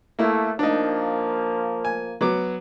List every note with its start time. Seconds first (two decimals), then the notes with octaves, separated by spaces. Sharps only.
0.19 A3 A#3 E4
0.59 F3 A#3 D4 D#4
1.85 G#5
2.21 F#3 B3 D6